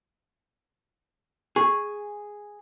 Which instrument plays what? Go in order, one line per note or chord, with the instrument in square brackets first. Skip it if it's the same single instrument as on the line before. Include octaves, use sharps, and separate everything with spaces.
[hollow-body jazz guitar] G#4 [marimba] C#6